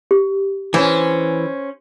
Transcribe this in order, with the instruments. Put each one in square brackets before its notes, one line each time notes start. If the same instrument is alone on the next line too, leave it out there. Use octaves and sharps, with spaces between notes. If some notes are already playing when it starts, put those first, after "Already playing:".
[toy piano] G4
[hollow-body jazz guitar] E3 [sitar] C#4 C5